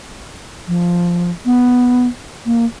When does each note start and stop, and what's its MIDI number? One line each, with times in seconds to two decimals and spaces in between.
0.68 1.31 53
1.46 2.07 59
2.46 2.65 58